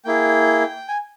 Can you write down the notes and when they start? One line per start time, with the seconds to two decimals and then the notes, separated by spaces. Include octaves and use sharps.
0.05 A#3 E4 G#4 G5
0.88 G#5